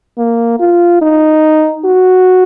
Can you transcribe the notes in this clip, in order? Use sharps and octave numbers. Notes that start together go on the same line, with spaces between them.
A#3
F4
D#4
F#4